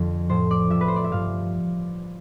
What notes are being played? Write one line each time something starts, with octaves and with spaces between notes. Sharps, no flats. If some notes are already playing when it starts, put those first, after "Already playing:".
Already playing: F2 D3 F3
A2 F3 C5
D5
A2 F3 E5
B4
C5
D5
E5
G2 F3 F5